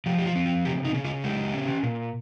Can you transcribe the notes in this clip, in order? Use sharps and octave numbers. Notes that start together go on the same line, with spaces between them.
F3 G4
G4
F4
C4
F4
C#3 G4
D#4
C#3
F4
G#3 G4
C#4
A#2